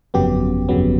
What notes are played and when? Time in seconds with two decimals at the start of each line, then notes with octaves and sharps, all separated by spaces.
0.14 G1 F2 C#3 F#3 B3 G4
0.69 G1 F2 C#3 F#3 B3